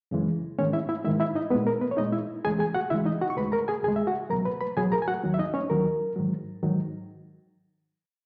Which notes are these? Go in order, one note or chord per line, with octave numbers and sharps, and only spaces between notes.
F#2 C#3 E3 G#3
G#2 D#3 G#3 C#4 C#5
E4 E5
E4 E5
G#2 D#3 G#3 E4 E5
E4 E5
D#4 D#5
A#2 G#3 B3 B4
A#4
B3 B4
C#5
A#2 G#3 D#4 D#5
E4 E5
C#2 C#3 E3 G#3 G#4 G#5
G#4 G#5
F#4 F#5
C#2 C#3 E3 G#3 E4 E5
D#4 D#5
F#4 F#5
C#6
D#2 C#3 G#3 B4 B5
A#4 A#5
G#4 G#5
D#2 C#3 G#3 G#4 G#5
E5
F#4 F#5
C#2 B2 F#3 A#4 A#5
B4 B5
B4 B5
C#2 B2 F#3 G#4 G#5
A#4 A#5
G#5
F#4 F#5
D#2 D#3 F#3
E5
D#4 D#5
C#4 C#5
D#2 D#3 F#3 A#4
G#2 D#3 F#3
G#2 D#3 F#3